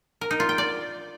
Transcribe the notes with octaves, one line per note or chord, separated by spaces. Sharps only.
A#4
D#4
F4
G5
D5